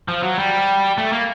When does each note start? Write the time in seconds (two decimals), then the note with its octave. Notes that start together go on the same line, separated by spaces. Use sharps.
0.08 F3
0.23 F#3
0.38 G3
0.98 A3
1.12 A#3